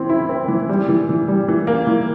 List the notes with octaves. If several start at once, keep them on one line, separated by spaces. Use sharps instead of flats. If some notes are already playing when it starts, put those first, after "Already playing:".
Already playing: E3 C4
E4
C4
E3
G3
E3
E3
G3
E3
A#3
E3